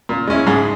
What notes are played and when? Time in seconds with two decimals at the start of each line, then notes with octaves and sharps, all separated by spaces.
0.09 A#2
0.27 G#3 C#4 E4
0.47 G#2 G#4